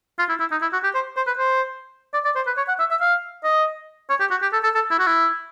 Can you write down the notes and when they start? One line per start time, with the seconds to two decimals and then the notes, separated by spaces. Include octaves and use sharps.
0.19 F4
0.29 E4
0.40 E4
0.51 D#4
0.62 E4
0.73 F#4
0.84 G4
0.94 C5
1.16 C5
1.27 B4
1.38 C5
2.14 D5
2.25 D5
2.36 C5
2.46 B4
2.57 C#5
2.68 F#5
2.79 E5
2.90 E5
3.01 F5
3.44 D#5
4.10 C#5
4.20 G4
4.31 F#4
4.42 G4
4.53 A4
4.64 A4
4.75 A4
4.91 E4
4.99 F#4
5.07 E4